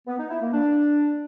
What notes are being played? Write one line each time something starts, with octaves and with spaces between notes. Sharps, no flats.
B3
D#4
E4
A#3
D4